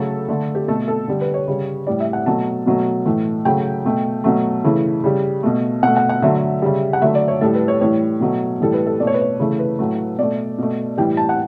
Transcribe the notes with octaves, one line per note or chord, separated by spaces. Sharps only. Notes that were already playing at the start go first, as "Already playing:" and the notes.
Already playing: C#3 F#3 A3 A4
D3 A3
G4
B2 A3 A4
A4
D3 G3
B4
C#5
C#3 G3
A2 G3 D5
E5
F#5
B2 F#3 A3 A5
B2 F#3 A3
A2 E3 A3
C#3 F#3 A3 G5
B2 A3
B2 F#3 A3
C#3 E3 A3
C#3 G3
B2 A3
B2 A3 F#5
F#5
F#5
D3 F#3 A3 E5
C#3 G3
F#5
D3 F#3 A3 E5
D5
C#5
A2 G3 A4
B4
C#5
A2 E3 G3 C#5
B2 F#3 A3
A2 E3 G3 A4
B4
A4
B2 A3 C#5 D5
B4
C#5
C#3 E3 A3
B4
A2 F#3 A3
B2 A3 D5
B2 A3
A2 E3 G3 G5
A5
F#5